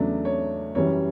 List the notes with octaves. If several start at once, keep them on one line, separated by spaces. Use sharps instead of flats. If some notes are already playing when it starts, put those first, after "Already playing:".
Already playing: E2 C#3 F#3 A3 D4
C#5
F#2 E3 G3 C#5